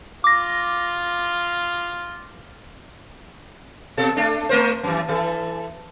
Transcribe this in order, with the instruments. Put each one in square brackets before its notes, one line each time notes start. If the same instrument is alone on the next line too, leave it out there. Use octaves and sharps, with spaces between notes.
[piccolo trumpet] F4 [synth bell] D6 A#6
[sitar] B2 A4
A3 D4
A3 A#4 C5
F#2 E3
E3 A4